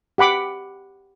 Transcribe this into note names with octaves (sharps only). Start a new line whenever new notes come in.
G4 F#5 B5 D6